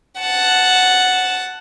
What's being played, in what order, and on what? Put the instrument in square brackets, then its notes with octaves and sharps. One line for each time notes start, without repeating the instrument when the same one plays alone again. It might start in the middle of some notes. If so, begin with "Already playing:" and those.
[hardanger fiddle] F#5 A5